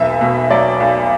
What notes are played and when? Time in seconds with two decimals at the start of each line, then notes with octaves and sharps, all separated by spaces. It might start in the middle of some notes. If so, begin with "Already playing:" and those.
Already playing: E1 B1 E5
0.21 B2
0.50 F#3 D5
0.80 B1